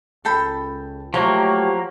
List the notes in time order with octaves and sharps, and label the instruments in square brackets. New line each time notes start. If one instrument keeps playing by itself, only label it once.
[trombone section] C#2 [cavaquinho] A4 G5 B5
[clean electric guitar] F3 F#3 A#3 [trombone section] A3 G4 [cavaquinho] C#5